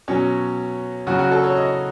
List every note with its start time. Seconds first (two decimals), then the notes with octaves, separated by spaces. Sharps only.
0.08 B2 F#3 C#4
1.07 C#3 F#3 F#4
1.19 F#4
1.31 A4
1.44 C#5
1.56 D#5